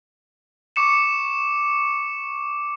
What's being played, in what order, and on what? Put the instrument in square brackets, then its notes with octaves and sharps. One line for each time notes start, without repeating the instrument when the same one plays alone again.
[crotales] C#6 D6 C#7 E7